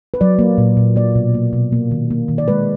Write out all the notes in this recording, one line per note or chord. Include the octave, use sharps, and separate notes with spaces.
B4
F#3 D5
A#3
A#2
A#2
A#3 D5
B2
A#3
B2
A#3
D#3
A#3
D#3
D5
G#3 B4